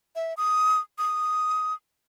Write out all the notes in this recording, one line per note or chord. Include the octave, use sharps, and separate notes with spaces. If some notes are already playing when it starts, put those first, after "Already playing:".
E5
D#6
D#6